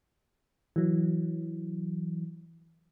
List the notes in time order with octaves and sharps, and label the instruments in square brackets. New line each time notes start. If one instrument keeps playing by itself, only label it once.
[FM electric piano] E3 F#3